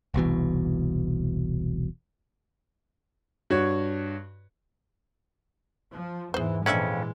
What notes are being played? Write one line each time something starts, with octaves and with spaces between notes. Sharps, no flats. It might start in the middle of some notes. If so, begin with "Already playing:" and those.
E1 C2 B2 E3
G2 F#4 C#5
F3
E2 G#2 E3 G#4 C5
F2 A#2 E3 G#3 C#4 D4 D5 E5